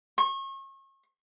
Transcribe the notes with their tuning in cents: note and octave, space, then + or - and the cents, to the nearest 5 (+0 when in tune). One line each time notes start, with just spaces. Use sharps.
C#6 -35